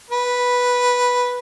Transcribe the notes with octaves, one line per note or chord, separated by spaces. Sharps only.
B4